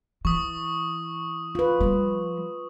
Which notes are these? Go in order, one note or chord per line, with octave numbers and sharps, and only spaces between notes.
E3 C#6 D#6
F4 B4
F3 G3